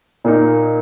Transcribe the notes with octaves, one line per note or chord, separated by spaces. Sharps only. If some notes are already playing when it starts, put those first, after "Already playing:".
A#2 A#3 D#4